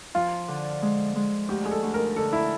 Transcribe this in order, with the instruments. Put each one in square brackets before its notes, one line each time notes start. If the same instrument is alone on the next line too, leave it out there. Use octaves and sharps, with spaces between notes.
[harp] F3 [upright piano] F4
[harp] D3
G#3
G#3
[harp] D2 [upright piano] G4
[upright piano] G#4
A4
[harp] D2
[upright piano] A#4
[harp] D3 [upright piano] A4
[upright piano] E4